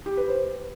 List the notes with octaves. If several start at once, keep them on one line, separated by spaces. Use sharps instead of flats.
G4
B4
C5